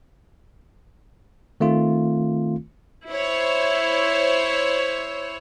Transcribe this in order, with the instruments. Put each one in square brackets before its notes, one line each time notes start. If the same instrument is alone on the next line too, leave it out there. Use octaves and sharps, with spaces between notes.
[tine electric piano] D#3 A3 C4 F4
[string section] E4 C5 C#5